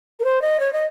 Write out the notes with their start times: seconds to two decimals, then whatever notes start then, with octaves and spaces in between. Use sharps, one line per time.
0.19 A#4
0.24 C5
0.41 D#5
0.59 C#5
0.72 D#5